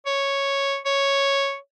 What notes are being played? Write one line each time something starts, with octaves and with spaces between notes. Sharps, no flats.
C#5
C#5